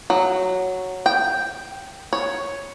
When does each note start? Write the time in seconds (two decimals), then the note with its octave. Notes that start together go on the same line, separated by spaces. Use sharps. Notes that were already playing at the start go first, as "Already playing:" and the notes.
0.10 F#3
1.06 G5
2.13 C#5